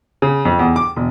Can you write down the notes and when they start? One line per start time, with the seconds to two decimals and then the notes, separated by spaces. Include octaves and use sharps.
0.22 C#3
0.45 F2
0.59 E2
0.76 D6
0.96 E1